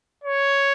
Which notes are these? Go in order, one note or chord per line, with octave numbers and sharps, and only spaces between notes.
C#5